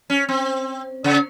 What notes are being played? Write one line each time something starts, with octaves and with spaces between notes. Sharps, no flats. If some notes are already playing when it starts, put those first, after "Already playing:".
C#4
C4
C#3